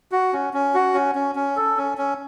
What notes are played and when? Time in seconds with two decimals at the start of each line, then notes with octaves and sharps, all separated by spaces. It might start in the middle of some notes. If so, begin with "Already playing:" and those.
0.12 F#4
0.33 C#4
0.53 C#4
0.74 F#4
0.94 C#4
1.15 C#4
1.35 C#4
1.56 A4
1.77 C#4
1.98 C#4